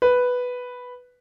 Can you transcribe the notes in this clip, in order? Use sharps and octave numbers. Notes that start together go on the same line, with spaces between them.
B4